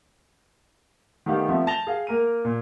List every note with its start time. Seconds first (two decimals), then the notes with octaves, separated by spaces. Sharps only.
1.26 D#3 A3 B3 G4 F5
1.49 F3 A3 B3 C4 E5
1.67 A5 A#6 F7 G7
1.87 G#4 F5
2.07 A#3 A#4 D#7
2.45 A#2